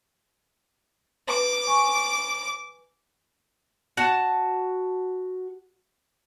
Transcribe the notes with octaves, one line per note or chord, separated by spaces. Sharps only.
B4 D6
G#5 C#6
F#4 A5